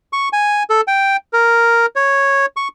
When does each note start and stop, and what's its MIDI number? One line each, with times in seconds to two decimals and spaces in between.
0.13 0.29 85
0.33 0.63 80
0.70 0.81 69
0.88 1.17 79
1.33 1.86 70
1.96 2.46 73
2.57 2.68 85